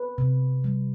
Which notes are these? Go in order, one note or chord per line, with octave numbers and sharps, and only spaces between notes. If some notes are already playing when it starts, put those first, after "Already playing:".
Already playing: B4
C3
G3